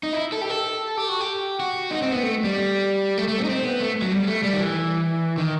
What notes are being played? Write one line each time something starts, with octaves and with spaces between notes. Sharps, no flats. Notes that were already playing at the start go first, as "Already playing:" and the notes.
D#4
E4
A4
G4
A4
G4
F#4
G4
F#4
D#4
C4
B3
A3
G3
A3
A3
C4
D#4
C4
B3
A3
F#3
G3
A3
G3
D#3
E3
D#3